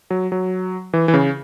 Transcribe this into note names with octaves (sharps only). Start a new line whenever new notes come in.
F#3
F#3
E3
E3
C#3